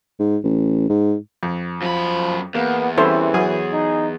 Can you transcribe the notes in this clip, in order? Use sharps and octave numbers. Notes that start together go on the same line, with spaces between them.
G#2
A1
G#2
F2
F#2 F3 B5
E2 A#3 B3 F5
E3 G3 C4 C#4 E4 A4 C5
F#3 F#4 G#4 G#5
D#4